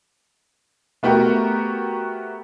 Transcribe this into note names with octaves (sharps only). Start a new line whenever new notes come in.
A3 B3 F#4 G4 A#4